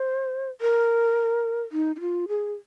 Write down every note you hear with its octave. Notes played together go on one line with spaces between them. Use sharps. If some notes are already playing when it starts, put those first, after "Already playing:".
Already playing: C5
A#4
D#4
D#4
F4
G#4